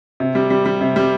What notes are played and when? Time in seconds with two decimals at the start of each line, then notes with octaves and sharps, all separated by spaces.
0.20 C3
0.35 G3
0.50 G3
0.66 G3
0.81 C3
0.96 G3